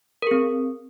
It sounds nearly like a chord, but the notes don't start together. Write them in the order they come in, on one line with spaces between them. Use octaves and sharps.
A#4 G#4 C4